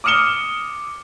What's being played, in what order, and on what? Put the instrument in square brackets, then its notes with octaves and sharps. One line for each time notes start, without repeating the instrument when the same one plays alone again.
[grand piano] D6 D#6 F6 C#7 E7 G7